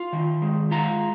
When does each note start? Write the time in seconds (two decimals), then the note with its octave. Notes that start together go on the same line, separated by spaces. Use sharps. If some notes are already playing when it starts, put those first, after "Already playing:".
Already playing: F4
0.13 D#3
0.42 G#3
0.71 F4 A#5